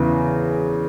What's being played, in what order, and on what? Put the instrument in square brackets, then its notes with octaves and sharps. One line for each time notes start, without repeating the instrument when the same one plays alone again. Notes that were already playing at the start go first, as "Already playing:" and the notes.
Already playing: [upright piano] E2 C#3 E3